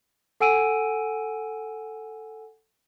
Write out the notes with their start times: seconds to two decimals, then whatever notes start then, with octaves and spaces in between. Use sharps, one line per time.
0.40 A4 F#5 G#5 E6 D7 D#7